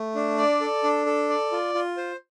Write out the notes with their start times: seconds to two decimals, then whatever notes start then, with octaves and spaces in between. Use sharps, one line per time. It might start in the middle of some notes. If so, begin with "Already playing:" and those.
Already playing: A3
0.15 D4
0.38 D5
0.61 A4
0.84 D4
1.06 A4
1.29 D5
1.52 F4
1.75 F4
1.97 C5